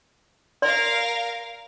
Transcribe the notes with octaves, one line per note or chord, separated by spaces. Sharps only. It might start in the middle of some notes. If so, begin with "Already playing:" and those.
A#4 D5 F5 C6